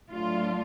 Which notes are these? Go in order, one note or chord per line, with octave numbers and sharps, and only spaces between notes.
A2 F#3 A3 D4 F4